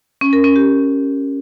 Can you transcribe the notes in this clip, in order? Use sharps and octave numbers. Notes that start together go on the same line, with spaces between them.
C#4
A#4
C#4
G4